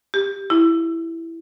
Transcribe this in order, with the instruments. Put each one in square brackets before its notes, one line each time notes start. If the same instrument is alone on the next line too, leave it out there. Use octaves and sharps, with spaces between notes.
[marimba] G4
E4